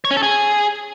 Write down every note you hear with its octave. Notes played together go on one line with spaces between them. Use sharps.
C#5
C#4
A4
G#4